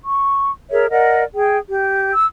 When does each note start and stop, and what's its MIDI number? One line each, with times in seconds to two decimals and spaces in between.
0.05 0.51 85
0.71 0.87 68
0.71 0.87 70
0.71 0.87 73
0.71 0.87 76
0.90 1.23 70
0.90 1.23 74
0.90 1.23 75
0.90 1.23 78
1.34 1.57 68
1.34 1.57 79
1.69 2.12 67
2.13 2.26 88